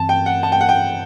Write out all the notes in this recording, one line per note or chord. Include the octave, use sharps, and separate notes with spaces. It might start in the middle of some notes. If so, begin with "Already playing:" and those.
Already playing: G2 E3 C4 A5
G5
F#5
A5
G5
F#5
G5